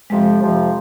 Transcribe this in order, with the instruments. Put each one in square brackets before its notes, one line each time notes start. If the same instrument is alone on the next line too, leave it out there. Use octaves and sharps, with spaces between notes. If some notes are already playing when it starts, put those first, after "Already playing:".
[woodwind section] F2 C3 F3 [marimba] G#3
[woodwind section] F2 C3 F3